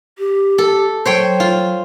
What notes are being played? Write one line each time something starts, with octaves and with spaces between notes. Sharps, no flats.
G4
A4
F#3 C5 C#5 G5
F4